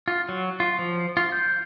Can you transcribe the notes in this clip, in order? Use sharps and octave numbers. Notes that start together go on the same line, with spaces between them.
F4
F#3
F4
F3
F4
G6